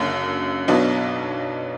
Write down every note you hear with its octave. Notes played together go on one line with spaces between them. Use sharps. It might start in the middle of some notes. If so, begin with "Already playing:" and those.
Already playing: F#1 F#2 D3 A#3
B1 B2 F#3 B3 D4